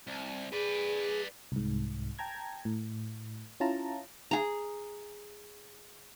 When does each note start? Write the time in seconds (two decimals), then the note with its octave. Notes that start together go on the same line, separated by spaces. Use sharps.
0.07 C2
0.53 G#4 B4 D5
1.52 C2 G#2
2.19 G5 A5 A#5 G#6
2.65 A2
3.60 C#4 E4 F4 A5 A#5
4.31 G#4 A#5